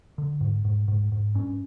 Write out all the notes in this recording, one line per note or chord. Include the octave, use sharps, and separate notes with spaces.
D3
G#2
G#2
G#2
G#2
G2 C#4